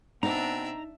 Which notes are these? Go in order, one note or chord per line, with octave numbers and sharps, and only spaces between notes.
B2 C4 D4 D#4 E5 A#5